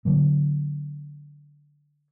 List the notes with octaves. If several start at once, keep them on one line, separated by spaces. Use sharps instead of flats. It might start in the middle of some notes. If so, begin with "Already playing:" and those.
D3 F#3 A#3